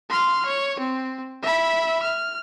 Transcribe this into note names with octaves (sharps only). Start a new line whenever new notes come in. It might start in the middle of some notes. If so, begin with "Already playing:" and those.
C6 F6
C#5
C4
E5 B5
F6